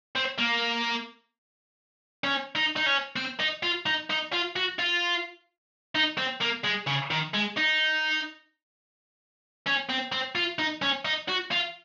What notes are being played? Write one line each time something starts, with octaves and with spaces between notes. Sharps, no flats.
C4
A#3
C#4
D#4
D#4
C#4
C4
D#4
F4
D#4
D#4
F4
F#4
F4
D#4
C4
A#3
G#3
C#3
D#3
G#3
D#4
C#4
C4
C4
F4
D#4
C#4
D#4
F#4
F4